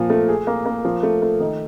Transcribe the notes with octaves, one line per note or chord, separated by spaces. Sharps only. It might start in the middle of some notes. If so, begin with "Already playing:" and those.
Already playing: A#2 F3
A3
G#4
A#3
A#3
F3
A3
A3
D#3